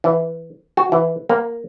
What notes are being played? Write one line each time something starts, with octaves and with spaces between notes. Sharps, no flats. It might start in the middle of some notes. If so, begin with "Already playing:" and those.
E3
F#4
E3
A#3